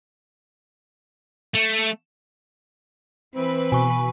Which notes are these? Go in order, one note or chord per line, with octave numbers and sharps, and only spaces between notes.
A3
E3 C4 B4
B2 G#5 C#6